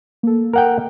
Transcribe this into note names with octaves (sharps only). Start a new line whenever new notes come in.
A#3 A4
A#4 F#5 G5